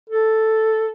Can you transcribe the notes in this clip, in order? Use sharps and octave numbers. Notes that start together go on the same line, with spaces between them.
A4